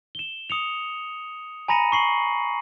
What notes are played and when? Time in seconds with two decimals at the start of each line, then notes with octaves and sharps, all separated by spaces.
0.15 E7 G7
0.50 D#6 C#7 F7
1.68 G#5 A#5 B5 A#6 C#7 D#7
1.92 C#6 C7 F#7